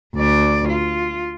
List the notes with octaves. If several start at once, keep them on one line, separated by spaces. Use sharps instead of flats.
D2 D5
F4